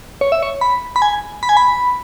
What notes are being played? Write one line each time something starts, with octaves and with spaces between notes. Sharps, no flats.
C#5
E5
C#5
B5
B5
G#5
B5
G#5
B5